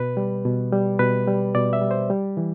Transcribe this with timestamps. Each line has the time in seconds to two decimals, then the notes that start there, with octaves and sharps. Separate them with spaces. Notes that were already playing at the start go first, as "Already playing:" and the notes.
Already playing: B2 B4
0.17 G3
0.45 B2
0.72 G3
0.99 B2 B4
1.27 G3
1.55 B2 D5
1.73 E5
1.82 G3
1.91 C5
2.10 G3
2.37 E3